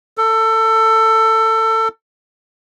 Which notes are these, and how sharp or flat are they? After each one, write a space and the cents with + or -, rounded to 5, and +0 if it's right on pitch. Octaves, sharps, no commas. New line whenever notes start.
A4 +20